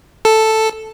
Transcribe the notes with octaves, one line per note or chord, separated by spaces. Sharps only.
A4